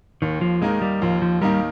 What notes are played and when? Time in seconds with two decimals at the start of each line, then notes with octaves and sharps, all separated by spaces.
0.22 D#2 D#3
0.41 F3
0.62 D#3 G#3 A#3 D#4 A#4
0.82 G3
1.02 D#2 F3
1.22 F3
1.41 D#3 G3 A#3 D#4 A#4